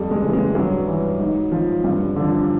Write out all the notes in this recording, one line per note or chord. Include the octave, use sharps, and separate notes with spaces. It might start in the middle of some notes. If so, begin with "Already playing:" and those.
Already playing: F2 G3
G#3
C#3 E3
G#3
G2 F#3
E3
G#2
F3
G2
D3 F3